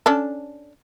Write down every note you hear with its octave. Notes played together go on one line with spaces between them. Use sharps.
C#4 D4 A4